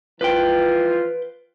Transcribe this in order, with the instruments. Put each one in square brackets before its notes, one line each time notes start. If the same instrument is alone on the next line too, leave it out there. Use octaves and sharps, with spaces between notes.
[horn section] E3 F3 F4 [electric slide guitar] B4 G5